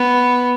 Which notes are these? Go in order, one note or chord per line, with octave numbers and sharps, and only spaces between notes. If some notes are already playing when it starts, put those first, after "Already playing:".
Already playing: B3